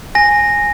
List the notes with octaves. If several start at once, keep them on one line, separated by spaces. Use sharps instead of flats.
G#5 A#6